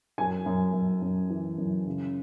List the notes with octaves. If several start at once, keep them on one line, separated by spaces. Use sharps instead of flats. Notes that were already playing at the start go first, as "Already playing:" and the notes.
F#2 G#5
F#2
F#2
F#2
E3
F#2
C#3